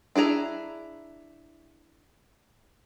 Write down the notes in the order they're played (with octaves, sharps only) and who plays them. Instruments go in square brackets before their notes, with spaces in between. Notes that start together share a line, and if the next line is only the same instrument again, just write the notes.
[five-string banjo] D4 E4 G#4 A#5